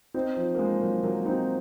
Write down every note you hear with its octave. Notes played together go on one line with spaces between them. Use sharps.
C4 D#4
F3
A#3
F3 G#3
F#3 A#3
F#3 A#3
C4 D#4